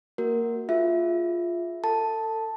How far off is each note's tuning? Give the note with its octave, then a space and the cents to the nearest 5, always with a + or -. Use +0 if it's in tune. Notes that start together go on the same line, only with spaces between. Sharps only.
A#3 -20 F#4 +0 A#4 +0
F4 +0 G#4 +0 E5 +0
A4 +30 A5 +0